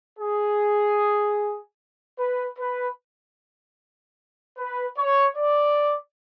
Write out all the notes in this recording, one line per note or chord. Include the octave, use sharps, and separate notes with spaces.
G#4
B4
B4
B4
C#5
D5